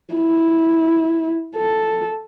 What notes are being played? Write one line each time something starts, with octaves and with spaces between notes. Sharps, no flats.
E4
A4